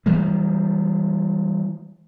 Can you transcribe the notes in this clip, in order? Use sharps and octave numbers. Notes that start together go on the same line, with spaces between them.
E3 G3 G#3